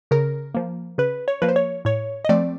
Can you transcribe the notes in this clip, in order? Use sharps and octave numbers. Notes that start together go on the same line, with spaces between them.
C#3 A#4
F3 A#3
C#3 B4
C#5
F3 A#3 B4
C5
C#5
A2 C#5
D#5
F3 A3 C4 D5